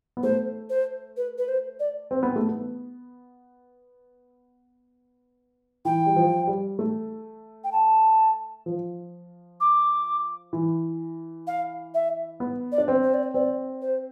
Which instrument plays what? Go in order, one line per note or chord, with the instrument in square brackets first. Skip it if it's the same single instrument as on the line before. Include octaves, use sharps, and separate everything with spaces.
[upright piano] B3
[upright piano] A3 [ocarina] C5
[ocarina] C5
B4
B4
C5
D5
[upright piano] C4
B3
A3
B3
[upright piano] E3 [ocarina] G5
[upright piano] G3
F3
G3
A3
[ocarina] G5
A5
[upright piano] F3
[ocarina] D6
[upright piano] E3
[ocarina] F5
E5
[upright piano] B3
[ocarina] D5
[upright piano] D4
C4
[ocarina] C5
D5
C5
[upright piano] C4 [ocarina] D5
[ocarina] C5